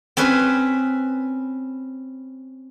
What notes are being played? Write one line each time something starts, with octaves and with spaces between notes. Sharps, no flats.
C4 C#4 B4